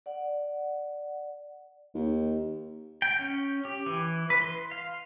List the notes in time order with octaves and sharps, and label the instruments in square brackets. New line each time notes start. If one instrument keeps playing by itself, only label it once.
[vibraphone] D5 F#5
[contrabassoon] D#2
[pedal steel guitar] G5
C#4
G4
E3
B4
C6
F5